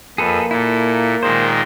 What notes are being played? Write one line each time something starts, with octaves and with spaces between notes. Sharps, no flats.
F2 A#3 G#4 A4 B4
A#2 E4 A4
A#2 D#3 G#3 C5